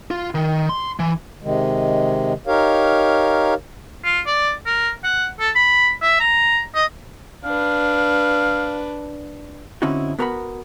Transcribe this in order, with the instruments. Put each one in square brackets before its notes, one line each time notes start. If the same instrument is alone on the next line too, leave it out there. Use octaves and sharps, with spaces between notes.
[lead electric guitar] F4
D#3
C6
E3
[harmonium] C3 D#3 G#3
D#4 G4 A#4 C#5 F5
[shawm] F4
D5
A#4
F#5
A4
B5
E5
A#5
D#5
[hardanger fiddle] D4 B4 [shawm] F5
[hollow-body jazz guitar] D3 C4 C#4 D#4 E4 F#4
B3 F#4 A#4 F#5 A5 B5